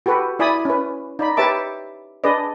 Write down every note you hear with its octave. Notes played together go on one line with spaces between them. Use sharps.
F#4 G4 A4 B4
E4 D5 G#5 B5 D#6
C#4 B4
D#4 D5 B5
G4 B4 C#5 E5 A5 D6
D4 G#4 B4 D5 D#5